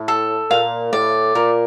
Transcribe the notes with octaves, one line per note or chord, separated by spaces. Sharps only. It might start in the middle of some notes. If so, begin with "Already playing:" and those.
Already playing: A2
A4
A#2 F5
A2 D5
A#2 A#4